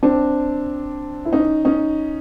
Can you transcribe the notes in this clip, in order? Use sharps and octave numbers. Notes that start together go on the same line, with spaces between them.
C4 D4
E4
C#4 D#4
C#4 D#4